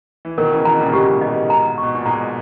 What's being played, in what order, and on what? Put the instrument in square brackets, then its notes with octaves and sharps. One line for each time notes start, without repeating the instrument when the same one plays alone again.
[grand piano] E3
[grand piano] B2 D#3 [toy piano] A#4
[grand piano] C#3 E3
[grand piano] B2 D#3 [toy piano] A#5
[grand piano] A#2 C#3
[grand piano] G#2 B2 [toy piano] G4
[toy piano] D#5
A#5
C#6
[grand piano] B2
A#2
[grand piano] G#2 [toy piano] A#5